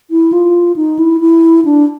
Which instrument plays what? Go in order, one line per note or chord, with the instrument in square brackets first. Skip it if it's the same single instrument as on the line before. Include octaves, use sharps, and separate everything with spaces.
[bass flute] E4
F4
D#4
E4
E4
D4